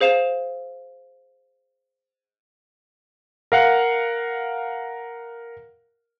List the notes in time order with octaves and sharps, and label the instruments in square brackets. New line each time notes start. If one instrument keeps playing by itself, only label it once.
[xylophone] G#4 C5 F5 E7 F7
[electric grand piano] A#4 F5 F#5